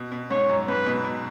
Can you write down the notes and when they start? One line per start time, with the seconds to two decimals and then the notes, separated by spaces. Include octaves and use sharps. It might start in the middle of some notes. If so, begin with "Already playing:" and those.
Already playing: B2
0.12 B2
0.30 G#2 C#5
0.49 F#2
0.68 G#2 B4
0.86 B2
1.05 B2